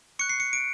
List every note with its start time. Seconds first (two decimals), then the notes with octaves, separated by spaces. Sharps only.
0.19 C#6 F#6 C#7
0.29 C7
0.40 C#7
0.53 D7